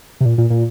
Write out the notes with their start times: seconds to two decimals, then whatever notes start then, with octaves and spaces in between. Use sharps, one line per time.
0.20 C3
0.25 A#2
0.38 A#2
0.50 A#2